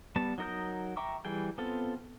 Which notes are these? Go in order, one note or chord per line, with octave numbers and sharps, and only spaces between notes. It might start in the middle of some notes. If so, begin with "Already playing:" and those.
G3 B3 A5
F#3 D#4 A#4 D#6 G6
E5 G5 A#5 C#6 D6
E3 G3 G#4 G5
B3 C4 F4 A4